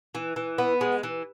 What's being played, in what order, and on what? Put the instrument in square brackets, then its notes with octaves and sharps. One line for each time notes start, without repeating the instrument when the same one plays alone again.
[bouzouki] E3
E3
B3
G#3
E3